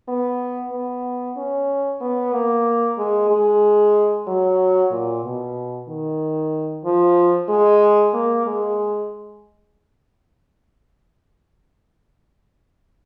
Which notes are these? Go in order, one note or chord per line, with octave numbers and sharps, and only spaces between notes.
B3
B3
C#4
B3
A#3
G#3
G#3
F#3
A#2
B2
D#3
F3
G#3
A#3
G#3